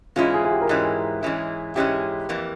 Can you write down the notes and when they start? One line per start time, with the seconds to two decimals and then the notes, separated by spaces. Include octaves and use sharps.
0.16 G#2 E3 G#3 C#4 E4 F4
0.34 G#4
0.44 G#4
0.51 G4
0.62 A#4
0.69 G#2 E3 G#3 C#4 E4 G#4
1.23 G#2 E3 G#3 C#4 E4
1.76 G#2 E3 G#3 C#4 E4 G4
2.29 F2 E3 A#3